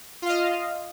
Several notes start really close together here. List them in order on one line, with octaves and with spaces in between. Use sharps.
F4 F5 D#5